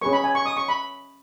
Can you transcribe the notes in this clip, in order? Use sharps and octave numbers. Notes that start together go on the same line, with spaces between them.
C#4 G#4 B4 C#6
B5
G#5
C#6
D#6
C#6
B5